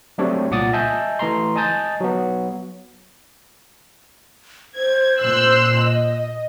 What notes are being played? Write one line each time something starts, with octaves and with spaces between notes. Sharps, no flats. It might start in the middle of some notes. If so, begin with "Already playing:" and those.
F#3 A3 C4 D4 G4 C#5
C2 A#2 F#5 D6 D#6 A6
D#5 E5 G#5 A5 G6
E3 A3 A#5 C6
D#5 G#5 A5 D#6 G6 A6
F#3 B3
C5 G#6
A#2 C6 E6 F#6
D#5